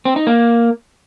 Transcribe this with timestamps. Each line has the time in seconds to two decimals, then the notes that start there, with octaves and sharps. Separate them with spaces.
0.05 C4
0.16 D#4
0.27 A#3